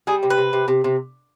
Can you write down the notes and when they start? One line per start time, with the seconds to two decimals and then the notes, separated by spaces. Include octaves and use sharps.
0.07 G3 G#4
0.23 C3
0.30 B4
0.37 C3
0.53 C3
0.68 C3
0.84 C3